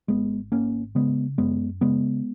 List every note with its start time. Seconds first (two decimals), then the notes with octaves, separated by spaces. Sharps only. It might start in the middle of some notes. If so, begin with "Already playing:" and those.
0.08 G#1 G#3 B3
0.52 G#1 A#3 C#4
0.95 C#3 G#3 B3
1.38 F#2 G#3 B3
1.81 C#3 G#3 B3